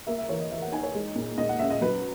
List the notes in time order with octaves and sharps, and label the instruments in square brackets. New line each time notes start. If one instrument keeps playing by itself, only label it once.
[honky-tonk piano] A#3 [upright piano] E5
[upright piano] E5
[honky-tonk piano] E3 [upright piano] C#5
[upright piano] D#5
[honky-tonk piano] E3 [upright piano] E5
[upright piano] F#5
[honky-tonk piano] D#4 [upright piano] G#5
[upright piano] C#5
[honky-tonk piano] G#3
A#2
[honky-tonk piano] A#2 [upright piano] D#5
[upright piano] F#5
[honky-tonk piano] C#4 [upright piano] E5
[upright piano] D#5
[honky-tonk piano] F#3 [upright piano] B4